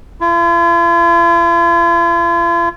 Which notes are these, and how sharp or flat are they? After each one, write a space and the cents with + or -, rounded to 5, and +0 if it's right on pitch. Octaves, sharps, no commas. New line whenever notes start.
F4 -45